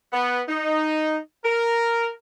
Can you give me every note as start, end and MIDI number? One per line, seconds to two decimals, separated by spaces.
0.13 0.42 59
0.49 1.19 63
1.45 2.11 70